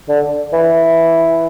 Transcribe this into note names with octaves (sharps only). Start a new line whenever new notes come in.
D3
E3